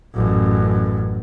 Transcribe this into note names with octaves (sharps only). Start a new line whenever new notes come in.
A1 F#2